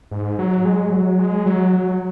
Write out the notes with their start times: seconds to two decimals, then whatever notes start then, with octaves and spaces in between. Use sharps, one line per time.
0.11 G#2
0.39 F#3
0.65 G#3
0.92 F#3
1.19 G#3
1.46 F#3
1.73 F#3